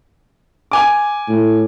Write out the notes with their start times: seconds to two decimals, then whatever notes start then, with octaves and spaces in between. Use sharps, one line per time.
0.71 G#5 D6
1.28 A2